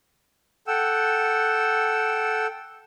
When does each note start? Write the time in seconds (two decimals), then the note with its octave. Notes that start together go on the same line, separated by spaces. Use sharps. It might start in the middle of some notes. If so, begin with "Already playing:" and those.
0.67 A4 F#5 G5 E6